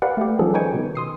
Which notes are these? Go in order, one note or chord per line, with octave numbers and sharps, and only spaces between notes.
G4 A#4 B4 D5 F5 F#5
A3 G4
D#3 F3 G3 C#4 G#4 A4
D#4 B4 C#5 G5 G#5 C#6
B2 D#3
C6 D#6 C7